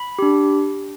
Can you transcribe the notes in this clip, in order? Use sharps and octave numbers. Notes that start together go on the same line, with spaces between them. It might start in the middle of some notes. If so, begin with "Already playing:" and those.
Already playing: B5
D4 G4